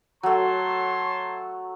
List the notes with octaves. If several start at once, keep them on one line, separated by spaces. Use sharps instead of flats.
F#3 A3 C#5 A5 C6